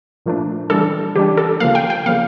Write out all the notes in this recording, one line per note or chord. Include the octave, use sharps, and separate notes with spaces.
A#2 F3 A3 D4
C#3 E3 G3 D4 A4
C#3 E3 G3 D4 G4
A4
C#3 F3 A#3 F5
G5
G5
C#3 F3 A#3 F5